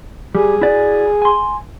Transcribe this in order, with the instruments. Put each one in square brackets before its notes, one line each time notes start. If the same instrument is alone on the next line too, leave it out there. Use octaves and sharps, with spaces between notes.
[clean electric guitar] G3 [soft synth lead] G#4
[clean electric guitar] E4 F#4 D5
G#5 C6